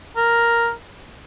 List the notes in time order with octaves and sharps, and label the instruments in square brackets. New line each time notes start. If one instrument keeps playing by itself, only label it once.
[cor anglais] A#4